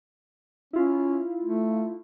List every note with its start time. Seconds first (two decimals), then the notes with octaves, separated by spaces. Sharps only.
0.73 C#4 E4 F4
1.43 A3